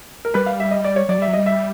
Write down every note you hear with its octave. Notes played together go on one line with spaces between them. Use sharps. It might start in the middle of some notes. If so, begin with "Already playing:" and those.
A#4
G3 B4
F5
E5
D#5
D5
C#5
F#3 D5
G3
E5
F#3
G3 D#5
E5